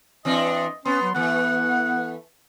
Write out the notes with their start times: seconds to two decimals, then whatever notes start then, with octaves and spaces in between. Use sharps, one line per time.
0.25 E3 C4 D4 D#5
0.86 B3 C#4 C6
1.02 F#3
1.15 E3 A3 B3 F#5